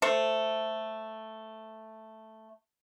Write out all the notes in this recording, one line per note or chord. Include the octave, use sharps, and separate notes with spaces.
A3 A4 C5